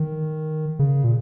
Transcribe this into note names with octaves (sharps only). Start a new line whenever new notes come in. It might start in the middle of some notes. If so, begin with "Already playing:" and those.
Already playing: D#3
C#3
A#2